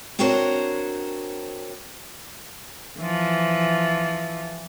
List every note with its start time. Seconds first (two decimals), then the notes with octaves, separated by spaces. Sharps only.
0.19 C4 D4 F#4 A#4 C5 C#5
3.00 E3 F3